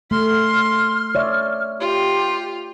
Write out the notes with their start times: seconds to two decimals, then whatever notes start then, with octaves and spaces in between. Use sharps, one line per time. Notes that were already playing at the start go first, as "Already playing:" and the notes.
0.11 A3 C6 F6
1.15 C#5 D5 E5
1.80 F4 G4